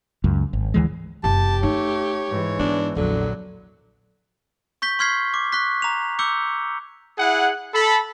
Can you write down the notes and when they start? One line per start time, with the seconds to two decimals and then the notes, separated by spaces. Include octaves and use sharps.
0.24 C#2 F#2
0.53 G#1
0.74 D2 E3 G#3
1.24 F#1 C3 G4 A5
1.63 A3 D#4 C#5
2.29 G#2 E3
2.59 B3 D4
2.96 A#1 E2 D3 F#3
4.82 C#6 G6 B6 G7
4.99 C6 C#6 F6 G#6 B6 C7
5.34 D6
5.52 C#6 F#6 B6
5.82 A#5 F7
6.19 D6 E6 G6 C#7 G7
7.18 E4 G#4 F#5
7.73 A4 B5